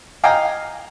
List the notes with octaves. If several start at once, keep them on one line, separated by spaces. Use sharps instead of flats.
D#5 F5 G5 G#5 A#5